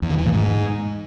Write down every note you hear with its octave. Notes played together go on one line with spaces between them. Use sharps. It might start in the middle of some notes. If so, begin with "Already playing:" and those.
E2
D#3
E3
A#2
G#2